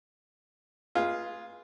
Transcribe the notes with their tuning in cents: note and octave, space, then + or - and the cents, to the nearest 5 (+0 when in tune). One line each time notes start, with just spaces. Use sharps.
F4 +0 G#4 +0 B4 -30